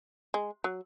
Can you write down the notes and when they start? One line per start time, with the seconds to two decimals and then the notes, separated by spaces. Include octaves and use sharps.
0.34 G#3
0.64 F#3